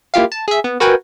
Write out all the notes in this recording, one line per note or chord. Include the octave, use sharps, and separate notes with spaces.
A#3 E4 F4 G4 F5
A5
G#4 E5
B3
F#4 A#4 B4 G5 G#5